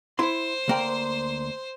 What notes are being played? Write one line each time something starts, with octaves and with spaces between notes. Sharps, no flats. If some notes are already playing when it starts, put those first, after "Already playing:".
E4 C5 C6
D2 A#3 G5